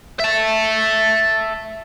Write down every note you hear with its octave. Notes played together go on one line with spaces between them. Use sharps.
E5 A5